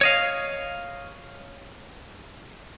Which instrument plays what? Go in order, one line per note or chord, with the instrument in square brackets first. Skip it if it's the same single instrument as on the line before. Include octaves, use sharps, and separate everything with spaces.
[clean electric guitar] C#5 D#5 F5